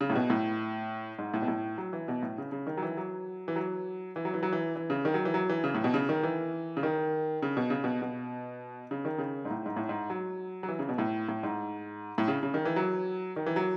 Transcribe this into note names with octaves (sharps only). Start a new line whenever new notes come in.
C#3
A2
B2
A2
G#2
A2
B2
A2
F#3
E3
B2
A2
C#3
C#3
D#3
F#3
E3
F#3
E3
F#3
E3
F#3
E3
F#3
E3
E3
C#3
D#3
F#3
E3
F#3
E3
C#3
A2
B2
C#3
D#3
E3
C#3
D#3
C#3
B2
C#3
B2
B2
C#3
D#3
C#3
G#2
A2
G#2
A2
G#2
F#3
F#3
E3
C#3
B2
A2
A2
G#2
A2
C#3
C#3
D#3
E3
F#3
D#3
E3
F#3